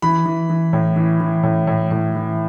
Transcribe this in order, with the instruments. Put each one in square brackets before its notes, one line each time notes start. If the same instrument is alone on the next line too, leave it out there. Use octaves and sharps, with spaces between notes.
[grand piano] E3 B5
E3
E3
A2
E3
E3
A2
A2
A2
E3